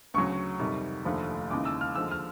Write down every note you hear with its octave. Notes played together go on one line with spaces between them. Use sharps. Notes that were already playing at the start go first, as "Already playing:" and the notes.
D2 C#3 F#3 C#6
F2 C3 D#3 G3
F1 D#2 D3 F3 A3
D#2 C#3 E3 G#3 D6
E6
F6
D#2 D3 F3 G#3 E6
F6